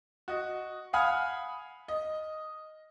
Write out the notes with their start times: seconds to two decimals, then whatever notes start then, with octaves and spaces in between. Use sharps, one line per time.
0.28 F#4 D#5
0.93 F5 F#5 G#5 B5 D#6 F6
1.88 D#5